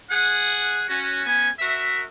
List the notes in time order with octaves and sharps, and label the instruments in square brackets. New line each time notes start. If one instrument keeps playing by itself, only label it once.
[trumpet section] G#4 F#5
C#4 F#4
B3 C#4 G#5
F#4 A#4 E5